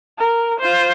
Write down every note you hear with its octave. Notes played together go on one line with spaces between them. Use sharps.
A#4
F4 C5